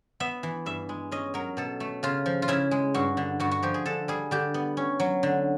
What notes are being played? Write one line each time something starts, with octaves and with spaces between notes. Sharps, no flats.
B3 E5
E3
G2 E5
G#3
C#4 D#5
F#3 A#4
B2 A4
A3
C#3 F4
F3
F4
C#3 E4
G#3
G2 F#4
D3
G2 F#4
F#4
F3 G4
G#4
D3 A4
G3 G#4
D3 G4
B3
C#4
F#3
D3